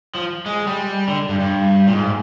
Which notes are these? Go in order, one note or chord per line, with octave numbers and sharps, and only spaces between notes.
F3
G#3
G3
D3
G2
G2
A#2
G#2